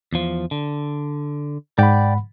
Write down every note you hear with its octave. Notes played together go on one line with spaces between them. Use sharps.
E2 F3
D3
G#2 D5 F#5 G5 B5